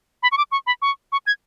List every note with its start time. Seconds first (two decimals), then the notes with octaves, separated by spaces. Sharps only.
0.23 B5
0.32 C#6
0.38 D6
0.52 C#6
0.67 B5
0.82 C#6
1.12 C#6
1.27 G#6